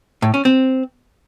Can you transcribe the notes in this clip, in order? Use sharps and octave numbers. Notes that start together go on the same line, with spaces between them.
A2
C#4
C4